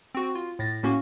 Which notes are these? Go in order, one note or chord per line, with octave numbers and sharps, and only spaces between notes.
C4 F#4
F4
A2 A6 A#6
A2 A#3 C#4 F#4